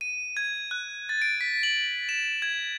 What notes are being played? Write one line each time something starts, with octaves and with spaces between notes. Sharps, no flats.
D#7
G#6
F#6
A6
D7
B6
F#7
E7
G#6